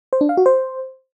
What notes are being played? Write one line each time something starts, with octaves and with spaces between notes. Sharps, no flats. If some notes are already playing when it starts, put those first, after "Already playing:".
C5
D4
F5
F#4
C5